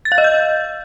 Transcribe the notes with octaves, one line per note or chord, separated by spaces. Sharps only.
A6
F5
D#5
G6